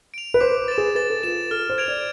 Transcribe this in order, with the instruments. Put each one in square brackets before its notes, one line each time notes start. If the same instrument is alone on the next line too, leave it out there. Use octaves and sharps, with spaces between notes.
[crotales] D7 F7
[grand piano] B4
[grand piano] C5 [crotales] D6
[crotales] A6 E7
[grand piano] G#4
[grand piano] B4 [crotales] A6
[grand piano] A4
[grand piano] F4 [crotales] E7
[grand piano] A4 [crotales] F6
[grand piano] C5
[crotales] G#6 D7 F7
[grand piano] D5